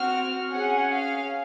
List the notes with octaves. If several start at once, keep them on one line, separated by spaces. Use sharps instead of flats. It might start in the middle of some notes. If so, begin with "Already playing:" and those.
Already playing: C4 F#4 F6
C#4 G#4 F#5
F5